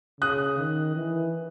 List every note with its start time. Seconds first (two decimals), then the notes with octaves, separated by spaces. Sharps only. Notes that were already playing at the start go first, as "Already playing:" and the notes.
0.21 C#3 D#6 F#6
0.58 D#3
0.95 E3